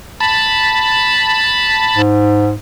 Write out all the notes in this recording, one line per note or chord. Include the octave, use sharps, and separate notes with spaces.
A5 B5
G#2